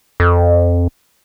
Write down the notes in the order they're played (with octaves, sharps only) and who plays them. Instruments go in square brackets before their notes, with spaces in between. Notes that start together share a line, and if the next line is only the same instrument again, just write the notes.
[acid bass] F2